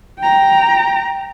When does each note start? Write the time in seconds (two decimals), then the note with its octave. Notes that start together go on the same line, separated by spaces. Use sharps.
0.19 G5 A#5